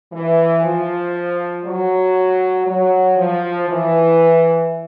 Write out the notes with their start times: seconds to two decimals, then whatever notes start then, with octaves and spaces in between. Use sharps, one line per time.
0.12 E3
0.63 F3
1.65 F#3
2.67 F#3
3.18 F3
3.69 E3